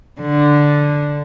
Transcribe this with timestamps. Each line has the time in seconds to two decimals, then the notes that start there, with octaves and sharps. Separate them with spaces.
0.21 D3